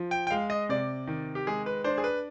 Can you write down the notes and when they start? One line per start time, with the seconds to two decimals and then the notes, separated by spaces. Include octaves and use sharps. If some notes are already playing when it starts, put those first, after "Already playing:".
Already playing: F3
0.11 G5
0.27 G5
0.30 G#3 F5
0.50 D#5
0.69 C3 D5
1.07 D#3
1.35 G4
1.47 G#3 G#4
1.66 B4
1.84 D4 C5
1.98 G#4
2.04 B4